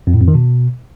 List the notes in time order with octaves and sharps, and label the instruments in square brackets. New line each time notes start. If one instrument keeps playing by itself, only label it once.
[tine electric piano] F2
A2
F2
D#3
B2